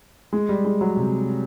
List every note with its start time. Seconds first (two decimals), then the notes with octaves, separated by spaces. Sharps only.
0.33 G#3
0.49 G3
0.65 G#3
0.81 F#3
0.97 C3